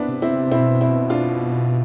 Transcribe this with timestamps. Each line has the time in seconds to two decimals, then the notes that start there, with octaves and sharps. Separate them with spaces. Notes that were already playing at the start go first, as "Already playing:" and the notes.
Already playing: B3 C4 D4 E4
0.08 C3
0.22 C4 E4
0.51 B2 C4 E4
0.81 C4 E4
1.10 D4 F4